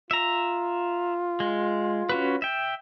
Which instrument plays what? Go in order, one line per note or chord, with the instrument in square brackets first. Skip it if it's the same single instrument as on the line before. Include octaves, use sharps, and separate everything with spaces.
[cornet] F4 [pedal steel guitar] E5 A#5
[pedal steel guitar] G#3
C#4 F#4 B4
E5 G5